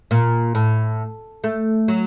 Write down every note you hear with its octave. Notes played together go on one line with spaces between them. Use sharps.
A#2
A2
A3
F#3